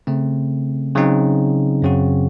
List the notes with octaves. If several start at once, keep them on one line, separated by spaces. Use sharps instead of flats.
C#3 A3 C4
C#3 F#3 C4 D#4
F#2 C#3 F#3 C4 F#4